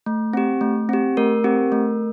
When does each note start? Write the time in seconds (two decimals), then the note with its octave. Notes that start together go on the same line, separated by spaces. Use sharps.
0.06 A3
0.33 C4 G4
0.61 A3
0.89 C4 G4
1.17 A3 A#4
1.44 C4 G4
1.72 A3